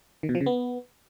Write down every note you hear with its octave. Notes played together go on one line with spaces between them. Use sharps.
D#3
B2
F3
C#3
B3